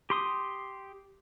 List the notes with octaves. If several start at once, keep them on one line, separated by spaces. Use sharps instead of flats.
G4 C6 D#6